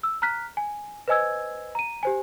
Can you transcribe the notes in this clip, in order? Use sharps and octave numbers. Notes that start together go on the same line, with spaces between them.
E6
A#5 F6 F#6 B6
G#5
B4 C5 D#5 G#5 E6 G#6
A#5 D#7
G4 C5 G#5